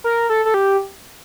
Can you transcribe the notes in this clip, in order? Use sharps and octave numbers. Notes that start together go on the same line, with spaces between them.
A#4
A4
A4
G4